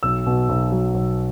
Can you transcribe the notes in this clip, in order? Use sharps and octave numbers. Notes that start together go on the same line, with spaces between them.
B1 E6
B2
B1
F#3
B1